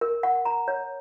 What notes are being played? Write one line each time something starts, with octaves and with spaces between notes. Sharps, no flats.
A#4
F#5
A#5
C#5